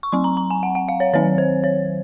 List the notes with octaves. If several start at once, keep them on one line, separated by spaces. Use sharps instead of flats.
C#6
F#3 C4 C6
A#5
A#5
G#5
F#5
F#5
F5
C#5
D#3 F#3 C4 C#5
C5
C#5